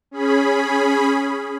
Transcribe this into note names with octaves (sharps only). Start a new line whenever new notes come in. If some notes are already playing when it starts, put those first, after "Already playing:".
C#4 G#4 B5